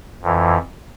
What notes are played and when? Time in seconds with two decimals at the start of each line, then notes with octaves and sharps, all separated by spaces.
0.23 F2 E3